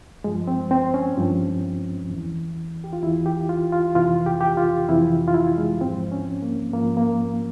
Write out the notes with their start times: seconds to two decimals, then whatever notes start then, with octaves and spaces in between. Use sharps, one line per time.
0.24 G2 F3 G#3
0.47 C4
0.71 C4
0.94 C#4
1.17 G2 F3
2.10 E2 E3
2.84 G4
2.93 F4
3.03 E2 E4
3.07 E3
3.26 G4
3.49 F4
3.72 F4
3.95 F2 C3 E3 F4
4.26 G4
4.41 G4
4.57 F4
4.88 F2 C3 E3 E4
5.28 F4
5.34 E4
5.58 G#3
5.81 G#2 F3 C4
6.12 C#4
6.42 A#3
6.73 G#2 F3 A#3
6.97 A#3